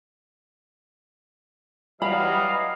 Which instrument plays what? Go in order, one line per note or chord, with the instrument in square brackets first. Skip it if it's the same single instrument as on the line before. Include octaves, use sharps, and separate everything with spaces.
[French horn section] E3 F#3 G3 [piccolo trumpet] D#5 [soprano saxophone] F5 [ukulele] B5